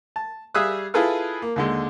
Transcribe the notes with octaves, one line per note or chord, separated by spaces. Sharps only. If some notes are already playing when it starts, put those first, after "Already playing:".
A5
G3 G#4 E5 F5 D#6 F#6
E4 F4 G#4 A4 B4 F5
A#3
D#2 D3 G#3